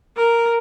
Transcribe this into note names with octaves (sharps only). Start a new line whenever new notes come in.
A#4